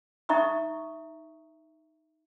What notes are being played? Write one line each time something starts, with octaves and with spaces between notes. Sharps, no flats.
D#4 E5 A#5 C#6 D#6